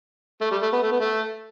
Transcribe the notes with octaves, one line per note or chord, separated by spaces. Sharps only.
A3
G3
A3
B3
A3
B3
A3